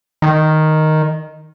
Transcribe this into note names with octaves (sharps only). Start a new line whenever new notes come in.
D#3